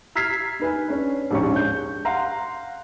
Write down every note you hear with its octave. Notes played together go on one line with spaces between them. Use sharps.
A#5 E6 F6 G#6 B6 C7
D#4 B4 G#5
C#4 D4
A#1 D#2 G#2 C#4 D4 C#6
G6
F5 F#5 A#5 C6